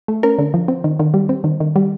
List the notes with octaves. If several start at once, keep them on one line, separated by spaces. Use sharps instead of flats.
A3
C#4 A#4
D3
F3
C4
D#3
D#3
G3
C4
D#3
D#3
G3